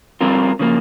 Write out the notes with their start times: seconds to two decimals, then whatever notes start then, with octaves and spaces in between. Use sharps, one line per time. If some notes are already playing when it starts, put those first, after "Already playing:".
0.21 G3 C4 F4 A#4
0.59 C#3 F3 A#3